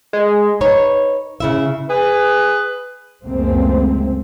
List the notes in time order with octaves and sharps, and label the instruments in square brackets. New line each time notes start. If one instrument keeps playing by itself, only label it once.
[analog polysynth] G#3
[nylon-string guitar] D#4 B4 C#5
C#3 E4 E5
[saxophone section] G#4 B4
[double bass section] C#2 F#2 C#3 A3 A#3 C4